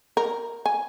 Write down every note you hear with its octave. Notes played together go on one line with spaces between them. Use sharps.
A#4
G#5